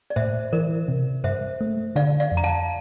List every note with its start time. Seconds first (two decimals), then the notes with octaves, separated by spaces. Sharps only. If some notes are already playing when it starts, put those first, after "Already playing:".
0.10 D5
0.16 A2 C5 E5
0.52 E3 A#4 D5
0.88 C3
1.24 G2 C5 E5
1.61 A3
1.96 D3 D5 F5
2.20 D5 F5
2.32 F2
2.37 A#5
2.44 F5 A5